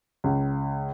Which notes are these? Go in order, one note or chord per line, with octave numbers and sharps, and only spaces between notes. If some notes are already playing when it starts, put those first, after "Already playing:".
C#2